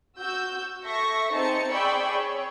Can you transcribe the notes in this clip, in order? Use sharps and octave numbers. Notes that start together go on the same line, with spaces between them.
F#4 E6 G6
A4 E5 C#6 A#6
C4 D#4 G#4 A5 C#7
G#4 D5 G5 B5 C#6 E6
C#5